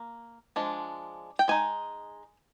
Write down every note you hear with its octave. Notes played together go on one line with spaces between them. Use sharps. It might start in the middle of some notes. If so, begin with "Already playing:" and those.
Already playing: A#3
F3 G#3 D4
G5
G#3 D#4 G#5